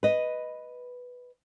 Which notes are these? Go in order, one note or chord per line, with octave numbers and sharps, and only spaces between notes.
B4 D#5